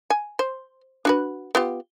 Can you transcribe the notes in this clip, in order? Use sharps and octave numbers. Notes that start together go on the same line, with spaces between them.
G#5
C5
D4 F#4 B4
B3 F4 G4